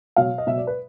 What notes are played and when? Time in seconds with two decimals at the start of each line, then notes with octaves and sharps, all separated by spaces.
0.16 B2 F#3 F5
0.38 D#5
0.47 B2 F#3 E5
0.57 D5
0.67 B4